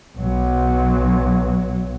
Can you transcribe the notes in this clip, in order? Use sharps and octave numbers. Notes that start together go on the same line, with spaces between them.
B1 F#3